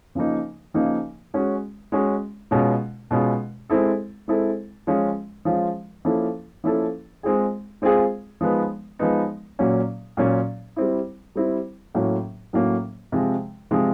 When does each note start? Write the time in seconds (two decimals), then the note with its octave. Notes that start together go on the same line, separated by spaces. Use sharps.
0.15 C#3 F3 A#3 D#4
0.74 C#3 F3 A#3 D#4
1.34 G#3 C#4 F#4
1.92 G#3 C#4 F#4
2.51 B2 G#3 C#4 F4
3.11 B2 G#3 C#4 F4
3.69 G#3 C4 E4 A4
4.28 G#3 C4 E4 A4
4.87 F3 G#3 C#4 F4
5.45 F3 G#3 C#4 F4
6.05 F3 A#3 C#4 E4 A4
6.64 F3 A#3 C#4 E4 A4
7.23 G#3 C4 F4 G#4
7.82 G#3 C4 F4 G#4
8.41 F3 G#3 B3 D#4
8.99 F3 G#3 B3 D#4
9.59 A#2 F#3 A#3 C#4
10.17 A#2 F#3 A#3 C#4
10.76 G3 C4 E4
11.35 G3 C4 E4
11.95 A2 F#3 A#3 C#4
12.53 A2 F#3 A#3 C#4
13.12 C3 F3 G#3
13.71 C3 F3 G#3